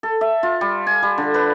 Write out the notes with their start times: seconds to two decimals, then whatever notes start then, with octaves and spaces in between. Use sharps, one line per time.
0.03 A4
0.21 E5
0.43 F4
0.61 G3
0.87 G#5
1.03 G3
1.18 D3
1.34 B4